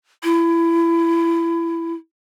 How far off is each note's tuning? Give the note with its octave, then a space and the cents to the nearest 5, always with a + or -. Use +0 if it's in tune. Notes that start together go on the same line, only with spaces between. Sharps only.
E4 +25